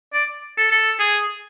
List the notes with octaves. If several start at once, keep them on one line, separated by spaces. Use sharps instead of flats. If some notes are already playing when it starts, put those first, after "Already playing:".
D5
A4
A4
G#4